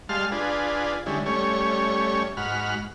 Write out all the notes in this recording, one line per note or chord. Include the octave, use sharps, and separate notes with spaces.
G3 G#3 F5 A5 C6 F6
D4 F4 G#4 B4
D3 G3 G#3 C#4 E4
G3 A3 C#4 C#5
G#2 F#4 B5 F6